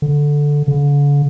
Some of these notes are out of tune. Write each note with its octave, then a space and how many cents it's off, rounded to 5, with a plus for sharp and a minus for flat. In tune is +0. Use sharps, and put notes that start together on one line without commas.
D3 -5
D3 -40